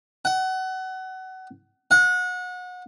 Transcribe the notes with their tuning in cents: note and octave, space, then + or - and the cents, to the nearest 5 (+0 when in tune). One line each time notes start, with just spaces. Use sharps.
F#5 +25
F#5 -30